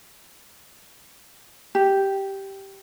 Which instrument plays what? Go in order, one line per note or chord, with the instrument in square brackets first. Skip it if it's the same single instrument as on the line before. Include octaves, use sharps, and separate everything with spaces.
[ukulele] G4